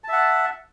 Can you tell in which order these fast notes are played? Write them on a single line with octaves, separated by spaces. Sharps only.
A5 E5 F#5